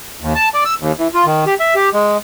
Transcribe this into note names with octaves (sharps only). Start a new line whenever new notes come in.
D#2
A5
D5
E6
D#2
E3
F4
D#3
G4
E5
G4
G#3